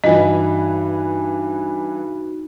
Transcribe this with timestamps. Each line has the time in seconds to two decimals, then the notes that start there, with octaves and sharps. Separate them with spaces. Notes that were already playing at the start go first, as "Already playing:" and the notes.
0.04 G2 E3 D#4 F#4 D#5